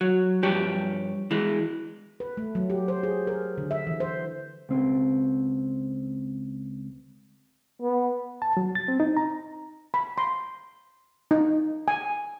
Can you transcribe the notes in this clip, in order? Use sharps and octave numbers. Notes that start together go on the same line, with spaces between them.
F#3
G2 F3 G4 C#5
E3 G#3
B4
A3
F#3
G4
C5
G#4
A#4
D3
E5
E3
C5
C#2 C4
B3
A5
F#3
A6
C4
D#4
A#5
B5
C6
D#4
G#5